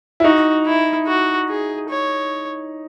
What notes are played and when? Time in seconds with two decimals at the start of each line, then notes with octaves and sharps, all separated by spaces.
0.20 E4
0.24 D#4 F#4
0.66 E4
1.07 F#4
1.49 G#4
1.90 C#5